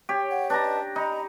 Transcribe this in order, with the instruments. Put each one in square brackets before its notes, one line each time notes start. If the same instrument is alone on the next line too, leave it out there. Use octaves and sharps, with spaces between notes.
[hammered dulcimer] G4 C#5
[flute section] F#5
[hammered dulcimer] D4 A#5 [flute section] B4 D#5 A5
[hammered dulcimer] D#4 [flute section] D#5 A#5 B5